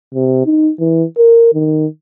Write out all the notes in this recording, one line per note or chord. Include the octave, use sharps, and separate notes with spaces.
C3
D#4
E3
A#4
D#3